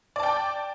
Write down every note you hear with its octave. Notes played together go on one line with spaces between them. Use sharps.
D5 G5 A5